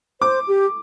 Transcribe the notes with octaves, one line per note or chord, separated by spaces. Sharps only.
C5 D6
G4